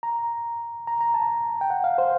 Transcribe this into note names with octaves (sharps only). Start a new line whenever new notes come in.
A#5
A#5
A#5
A5
G5
F#5
F5
C5